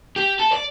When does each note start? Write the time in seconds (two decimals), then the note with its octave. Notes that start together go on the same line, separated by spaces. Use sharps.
0.16 G4
0.40 A4
0.53 D5